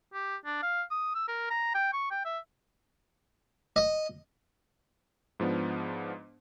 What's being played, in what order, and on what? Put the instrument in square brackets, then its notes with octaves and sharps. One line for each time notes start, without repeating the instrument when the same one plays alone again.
[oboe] G4
D4
F5
D#6
E6
A#4
A#5
G5
C#6
G5
E5
[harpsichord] D#5
[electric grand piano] G#2 F3 B3 D4